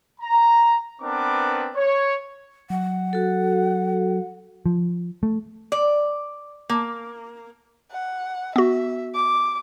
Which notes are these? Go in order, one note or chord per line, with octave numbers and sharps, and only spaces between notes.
A#5
B3 C4 D4 A#4 B4 D6
C#5
F#3 F#5
F#4 A4
F3
A3
D5
A#3
F#5
B3 F#4 E5
D6